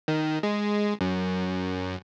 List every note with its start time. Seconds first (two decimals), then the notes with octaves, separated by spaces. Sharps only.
0.08 D#3
0.43 G#3
1.01 F#2